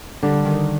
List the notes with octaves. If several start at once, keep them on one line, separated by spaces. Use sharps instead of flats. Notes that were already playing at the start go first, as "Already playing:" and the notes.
D3 G3 D4
D#3